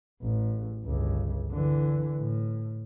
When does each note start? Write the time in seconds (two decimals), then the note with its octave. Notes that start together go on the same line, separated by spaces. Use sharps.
0.22 A1
0.84 G1 C#2
1.51 D3 E3
2.19 A2